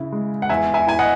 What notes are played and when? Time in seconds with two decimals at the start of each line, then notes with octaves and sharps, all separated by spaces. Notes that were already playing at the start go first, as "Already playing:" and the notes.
Already playing: C#3 E4
0.12 G#3
0.42 F#5
0.49 E2 E5 G#5
0.74 E5 G#5
0.87 E4 G#5
0.99 D#5 F#5